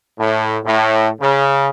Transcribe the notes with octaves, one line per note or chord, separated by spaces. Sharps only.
A2
A2
C#3